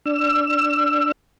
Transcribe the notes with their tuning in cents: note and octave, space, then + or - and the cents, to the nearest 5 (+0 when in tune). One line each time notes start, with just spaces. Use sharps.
D4 +0 E6 +30